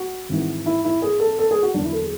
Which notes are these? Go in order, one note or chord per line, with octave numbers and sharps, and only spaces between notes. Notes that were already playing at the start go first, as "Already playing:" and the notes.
Already playing: F#4
G#1 G#2 E3
E4
E4
G#4
A4
A4
G#4
F#4
E2 D3 F#3 D4
E4
A4
G#4